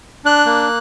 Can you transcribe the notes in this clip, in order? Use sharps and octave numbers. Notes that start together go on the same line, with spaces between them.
D4 F#6
A#3